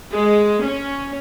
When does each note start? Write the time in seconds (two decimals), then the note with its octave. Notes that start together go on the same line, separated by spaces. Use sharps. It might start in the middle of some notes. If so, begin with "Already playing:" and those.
0.12 G#3
0.64 C#4